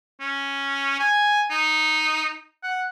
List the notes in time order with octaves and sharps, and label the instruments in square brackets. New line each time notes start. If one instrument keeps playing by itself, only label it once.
[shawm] C#4
G#5
D#4
F#5